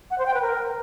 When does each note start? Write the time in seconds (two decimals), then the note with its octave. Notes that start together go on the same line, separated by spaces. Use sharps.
0.11 F#5
0.18 C5
0.26 G5
0.34 B4
0.42 A#4